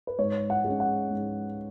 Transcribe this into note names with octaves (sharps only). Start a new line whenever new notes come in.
B4
G#2 C#5
F#5
G#3
C#4
F#5
G#2